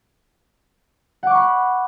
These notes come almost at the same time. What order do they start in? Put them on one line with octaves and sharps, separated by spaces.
F#5 D6 C#6 B5